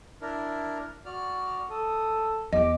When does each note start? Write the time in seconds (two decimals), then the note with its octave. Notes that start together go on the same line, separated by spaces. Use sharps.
0.22 D4 E4 A#4
1.06 F#4 D5 F6
1.70 A4 D#6
2.53 E2 G4 D#5 D6